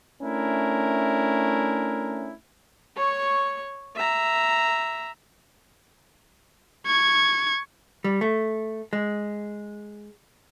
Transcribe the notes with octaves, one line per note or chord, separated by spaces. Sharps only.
A3 C#4 D4 E4 A#4
C#5 C#6
E5 A#5
C#6 G#6
G3
A3
G#3